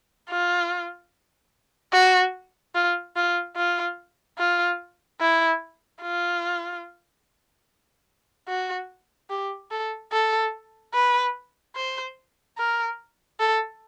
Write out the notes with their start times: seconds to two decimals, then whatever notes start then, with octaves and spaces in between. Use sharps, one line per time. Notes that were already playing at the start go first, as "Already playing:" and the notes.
0.30 F4
1.93 F#4
2.75 F4
3.16 F4
3.57 F4
4.39 F4
5.21 E4
6.02 F4
8.48 F#4
9.30 G4
9.71 A4
10.13 A4
10.94 B4
11.76 C5
12.58 A#4
13.40 A4